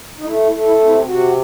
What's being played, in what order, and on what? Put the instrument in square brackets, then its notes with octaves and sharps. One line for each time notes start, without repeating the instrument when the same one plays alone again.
[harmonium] D#4
A3 E4
E4
A3
E4
C3
E4
C3 F#4